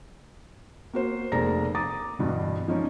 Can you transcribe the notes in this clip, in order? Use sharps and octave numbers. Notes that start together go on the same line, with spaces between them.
A#3 F#4 C5
F1 A#3 G#4 D5 A#5 A#6
A#5 D6 D#6 A6
E2 G2 B2 D3
F3 C#4 D#4 C#5 D5